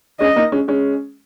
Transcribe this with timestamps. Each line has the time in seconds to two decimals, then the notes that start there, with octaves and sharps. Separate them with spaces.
0.20 G#3 C#4 D#5
0.36 A#3 D#4
0.52 G#3 C#4
0.68 G#3 C#4